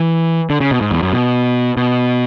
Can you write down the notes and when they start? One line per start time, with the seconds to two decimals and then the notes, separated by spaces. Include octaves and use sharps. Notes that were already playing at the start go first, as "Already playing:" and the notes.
Already playing: E3
0.50 D3
0.60 C#3
0.71 B2
0.81 G#2
0.92 E2
1.02 F#2
1.13 B2
1.77 B2